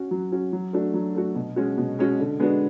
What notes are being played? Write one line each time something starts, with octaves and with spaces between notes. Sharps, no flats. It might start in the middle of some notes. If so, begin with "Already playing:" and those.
Already playing: C#4 F#4
F#3
C#4 F#4
F#3
A3 D4 F#4
F#3
A3 D4 F#4
B2
G#3 C#4 F#4
B2
G#3 C#4 F#4
D3
G#3 B3 D4 F#4